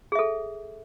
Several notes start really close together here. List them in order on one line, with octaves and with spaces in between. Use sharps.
G#4 E5 A4